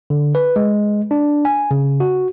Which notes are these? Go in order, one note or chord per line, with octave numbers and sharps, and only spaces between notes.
D3
B4
G#3
D4
G#5
C#3
F#4